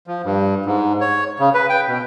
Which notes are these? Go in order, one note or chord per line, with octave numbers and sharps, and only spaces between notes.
F3
G2
G#2
C#5
C#3
B4
G5
B2